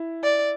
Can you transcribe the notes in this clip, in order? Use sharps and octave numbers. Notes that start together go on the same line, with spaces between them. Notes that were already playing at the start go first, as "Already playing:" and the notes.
Already playing: E4
D5